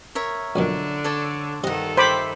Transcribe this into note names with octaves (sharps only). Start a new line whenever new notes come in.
A#4 C#5 E5
A#1 F#2 B2 D3 D4
A4 C#5 D5
G2 C3 D#3 A4 D#5 F#5
C5 E5 G5 B5 D6